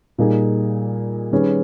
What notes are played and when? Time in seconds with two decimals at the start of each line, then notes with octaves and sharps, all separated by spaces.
0.18 A#2 G3 A#3 D#4 G#4
1.31 D#3 G3 C#4 G#4 B4